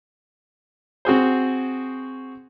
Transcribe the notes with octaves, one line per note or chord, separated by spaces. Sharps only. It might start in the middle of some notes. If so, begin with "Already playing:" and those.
C4 F#4 G#4 C5